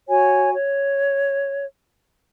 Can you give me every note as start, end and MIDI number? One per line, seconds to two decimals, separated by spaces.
0.09 0.52 66
0.09 0.52 73
0.09 0.52 80
0.52 1.65 73